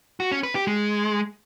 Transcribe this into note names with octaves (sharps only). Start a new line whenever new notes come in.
F#4
C#4
B4
G4
G#3